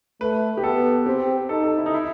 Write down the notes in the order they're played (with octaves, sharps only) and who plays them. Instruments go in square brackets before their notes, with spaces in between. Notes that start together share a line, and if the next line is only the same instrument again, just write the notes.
[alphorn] A3 [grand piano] B4
[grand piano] G4
[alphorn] B3 [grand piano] A4
[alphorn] C4 [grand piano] G4
[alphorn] D#4 [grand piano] A4
[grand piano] A4
E4
D#4
E4